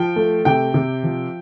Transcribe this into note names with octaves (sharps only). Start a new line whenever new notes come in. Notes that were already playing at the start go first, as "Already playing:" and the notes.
Already playing: F3 G5
A3
C3 G5
C3
F3